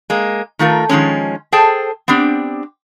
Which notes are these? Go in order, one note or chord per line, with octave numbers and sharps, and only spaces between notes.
G#3 A#3
D#3 A3 F4 A#4
D#3 F3 G#3 C#4
G#4 A4 C5 G5 A5
B3 C4 D4 G4